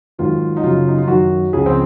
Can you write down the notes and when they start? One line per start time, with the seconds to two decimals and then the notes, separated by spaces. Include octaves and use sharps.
0.18 G#2 D#3 F#3 F4
0.57 D#4
0.64 F#2 C#3 F#3 F4
0.88 D#4
0.98 F4
1.08 F#2 D#3 F#3 F#4
1.53 C#2 C#3 F3 G#4
1.66 C4